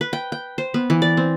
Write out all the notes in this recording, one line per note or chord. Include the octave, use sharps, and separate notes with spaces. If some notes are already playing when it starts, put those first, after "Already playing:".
B4
G5
G5
C5
B3
E3
D5
C4